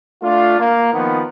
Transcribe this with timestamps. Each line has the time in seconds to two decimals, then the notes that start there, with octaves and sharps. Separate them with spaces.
0.22 A3 D4 F4
0.60 A#3
0.93 D#3 F3 B3